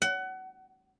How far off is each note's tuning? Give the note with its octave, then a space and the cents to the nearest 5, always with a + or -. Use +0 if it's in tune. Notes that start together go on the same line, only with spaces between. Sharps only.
F#5 +25